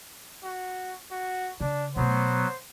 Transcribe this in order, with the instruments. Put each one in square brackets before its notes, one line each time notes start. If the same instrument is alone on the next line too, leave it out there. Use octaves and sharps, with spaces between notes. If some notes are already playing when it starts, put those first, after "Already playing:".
[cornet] F#4
F#4
[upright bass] C#3 [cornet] D4
[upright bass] B2 A3 [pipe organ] F#3 B3 [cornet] C5